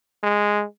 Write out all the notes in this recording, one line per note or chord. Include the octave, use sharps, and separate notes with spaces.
G#3